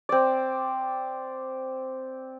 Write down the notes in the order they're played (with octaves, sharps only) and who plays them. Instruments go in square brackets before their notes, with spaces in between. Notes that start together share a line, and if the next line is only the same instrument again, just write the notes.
[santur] C4 D5